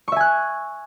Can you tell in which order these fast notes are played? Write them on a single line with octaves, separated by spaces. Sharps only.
C#6 E5 G#5 F#6